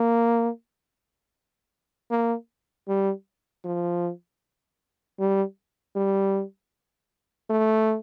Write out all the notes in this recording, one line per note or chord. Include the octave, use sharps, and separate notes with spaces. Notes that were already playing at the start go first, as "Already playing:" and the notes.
Already playing: A#3
A#3
G3
F3
G3
G3
A3